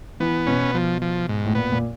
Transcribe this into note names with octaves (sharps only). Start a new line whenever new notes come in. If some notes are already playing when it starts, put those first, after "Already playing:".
E3 B3
B2 C#4
F3
F3
G#2
A2
A#2 B3
A#2